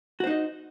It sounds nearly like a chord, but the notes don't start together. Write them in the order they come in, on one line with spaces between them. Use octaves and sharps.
F#4 C5 D#4 D#5